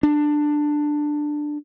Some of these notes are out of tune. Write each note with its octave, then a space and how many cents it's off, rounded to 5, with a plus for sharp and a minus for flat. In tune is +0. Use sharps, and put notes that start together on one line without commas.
D4 +10